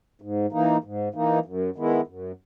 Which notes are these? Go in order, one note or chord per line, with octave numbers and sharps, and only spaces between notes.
G#2
E3 A#3 D#4
G#2
E3 A#3 D#4
F#2
D#3 G#3 B3 E4
F#2